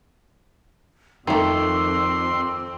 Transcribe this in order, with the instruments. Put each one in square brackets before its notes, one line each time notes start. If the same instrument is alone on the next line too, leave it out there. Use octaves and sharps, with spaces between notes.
[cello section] F2 C4 [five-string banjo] D#3 A3 [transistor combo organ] C6 [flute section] D6 E6